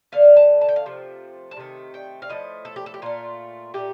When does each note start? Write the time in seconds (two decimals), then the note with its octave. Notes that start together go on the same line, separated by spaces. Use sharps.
0.12 D3 A3 F5
0.36 A5
0.61 A5
0.69 G5
0.76 F5
0.86 C3 F3 A3
1.51 A5
1.57 C3 D#3 A3
1.94 G5
2.22 F5
2.29 A2 F3 A3 D#5
2.65 A4
2.76 G4
2.86 A4
2.94 G4
3.02 A#2 A3 F4
3.74 A#2 A3 G4